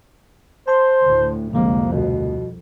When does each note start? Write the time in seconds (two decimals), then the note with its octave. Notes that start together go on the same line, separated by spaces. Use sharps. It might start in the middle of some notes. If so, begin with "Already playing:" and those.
0.68 C5 A5 C6
1.04 D2 A2
1.53 C2 F2 D3 F3 G#3 A#3
1.92 D2 B2